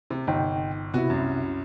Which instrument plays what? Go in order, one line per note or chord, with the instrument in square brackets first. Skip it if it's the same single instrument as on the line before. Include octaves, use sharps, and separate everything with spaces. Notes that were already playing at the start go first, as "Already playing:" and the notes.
[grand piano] C3
[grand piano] G1 [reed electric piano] C3 D#4 G5
[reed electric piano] C3 E4 [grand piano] B3 F#4
[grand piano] C2 F#2